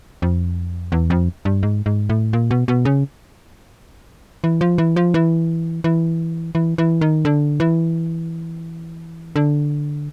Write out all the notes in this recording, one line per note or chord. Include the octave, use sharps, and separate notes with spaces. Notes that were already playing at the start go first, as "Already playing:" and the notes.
F2
E2
F2
G2
G#2
G#2
A2
A#2
B2
B2
C#3
E3
F3
E3
F3
E3
E3
E3
E3
D#3
D3
E3
D3